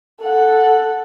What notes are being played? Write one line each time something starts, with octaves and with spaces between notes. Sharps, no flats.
A4 F#5